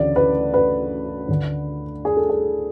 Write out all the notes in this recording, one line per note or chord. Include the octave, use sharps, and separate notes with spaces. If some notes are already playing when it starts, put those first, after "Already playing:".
Already playing: D2 C#3 E3 D5
B4
B4
D2 D3
G#4
A4
G#4